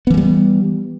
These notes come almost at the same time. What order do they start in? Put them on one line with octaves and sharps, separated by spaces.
B3 E3 G#3 G3